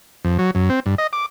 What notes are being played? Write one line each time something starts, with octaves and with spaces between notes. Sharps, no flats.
F2
F#3
F#2
C4
G2
D#5
D6